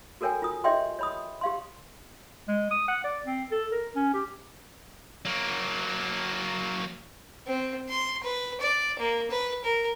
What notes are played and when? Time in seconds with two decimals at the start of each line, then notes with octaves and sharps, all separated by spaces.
0.21 F#4 A4 A#4 C#5 G5 G#5
0.42 F4 D#6
0.64 G4 C#5 D#5 E5 G5 C6
0.99 C#5 B5 D#6
1.41 G4 F5 C6
2.48 G#3
2.71 D#6
2.88 F#5
3.04 D5
3.25 C4
3.51 A4
3.72 A#4
3.96 C#4
4.13 G4
5.25 F#3 A#3
7.47 C4
7.89 C6
8.23 B4
8.60 D5
8.99 A#3
9.30 B4
9.64 A#4